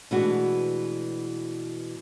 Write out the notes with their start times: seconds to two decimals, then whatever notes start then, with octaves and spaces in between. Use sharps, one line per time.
0.11 B2 E3 G#3 A3 D4 F#4